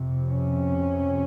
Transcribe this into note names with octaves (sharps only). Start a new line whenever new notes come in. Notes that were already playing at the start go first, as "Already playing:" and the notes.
Already playing: F2 C3
C#4